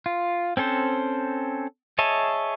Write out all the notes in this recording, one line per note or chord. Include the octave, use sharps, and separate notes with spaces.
F4
C4 C#4 A4 C5
G#4 C#5 D#5 E5 A5